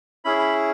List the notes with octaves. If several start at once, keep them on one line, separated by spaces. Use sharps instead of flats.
C#4 E4 G#4 B5
B5